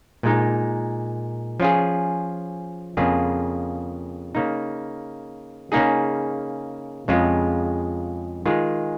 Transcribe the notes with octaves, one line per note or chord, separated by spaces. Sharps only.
A#2 G#3 D#4
F3 C#4 F4 G#4
F2 C#3 A#3 F4 G#4
C#3 A#3 D#4
C#3 A#3 D#4 G#4
F2 C#3 G#3 F4
D#3 G#3 F4 G#4